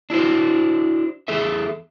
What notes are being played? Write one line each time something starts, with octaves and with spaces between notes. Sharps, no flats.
D4 E4 F#4 C5
E2 G#4 A4 E5